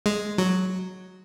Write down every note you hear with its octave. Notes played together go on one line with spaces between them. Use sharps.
G#3
F#3